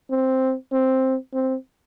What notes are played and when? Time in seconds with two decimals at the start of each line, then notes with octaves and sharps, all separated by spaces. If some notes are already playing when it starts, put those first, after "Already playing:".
0.10 C4
0.72 C4
1.33 C4